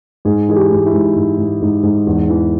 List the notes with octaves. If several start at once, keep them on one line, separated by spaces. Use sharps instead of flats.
G#2 G#4
E3 G#4
G4
G#2
E4
G#2
G#2
G#2
G#2
G#2
E2
E3